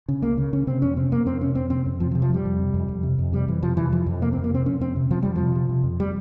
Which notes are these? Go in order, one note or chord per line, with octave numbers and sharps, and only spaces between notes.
C#3
C#2 A#3
C#3
C#3 C#4
C3 C4
F2 C#4
C3 C4
F2 A#3
F2 C4
C3 C#4
F2 C4
C3 C4
F2
C3 F3
F3
C3
F3
F2 G3
F2
C3
F2
F2
C3
F2
C3 G3
F2 E3
C3 F3
C3 E3
F2 F3
F2
C3 A#3
C4
F2
A#3
C3 C4
F2 C#4
F2 C4
C3
C3 F3
F2 G3
C3 F3
C3
C3
F2
G3